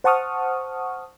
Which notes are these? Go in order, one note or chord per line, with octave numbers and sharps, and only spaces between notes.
C5 F#5 A5 C#6 D#6 F6